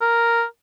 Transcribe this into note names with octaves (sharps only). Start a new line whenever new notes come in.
A#4